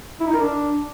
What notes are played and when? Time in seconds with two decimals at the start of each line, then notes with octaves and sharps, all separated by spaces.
0.20 E4
0.27 D#4
0.34 A#4
0.40 D4